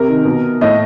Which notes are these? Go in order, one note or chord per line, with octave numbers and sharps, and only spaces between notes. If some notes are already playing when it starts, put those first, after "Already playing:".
Already playing: C3 A#4
D#3
B2
A2 D#5